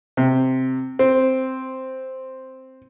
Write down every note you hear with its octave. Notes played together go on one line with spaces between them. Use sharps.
C3
C4